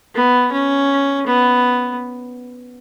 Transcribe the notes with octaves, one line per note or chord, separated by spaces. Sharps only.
B3
C#4
B3